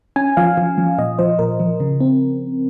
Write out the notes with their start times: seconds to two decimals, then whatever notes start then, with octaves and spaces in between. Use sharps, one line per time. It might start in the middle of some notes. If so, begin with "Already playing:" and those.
0.16 C#4 G#5
0.37 F3 F5
0.57 F3
0.78 F3
0.98 A#2 D#5
1.19 F3 C5
1.39 A#2 A#4
1.60 F3
1.80 C#3
2.00 C4